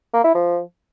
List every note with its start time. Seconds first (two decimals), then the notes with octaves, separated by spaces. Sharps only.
0.14 A#3
0.24 E4
0.35 F3